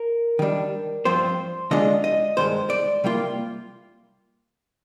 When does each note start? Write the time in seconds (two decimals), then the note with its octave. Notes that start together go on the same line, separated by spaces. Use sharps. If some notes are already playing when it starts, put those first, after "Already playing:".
Already playing: A#4
0.39 D#3 G3 D4
1.05 G2 F3 C4 F4 C5
1.71 D3 G#3 D4 F4 D#5
2.04 D#5
2.37 G2 D#3 G#3 C5
2.70 D5
3.04 C3 G3 A#3 F4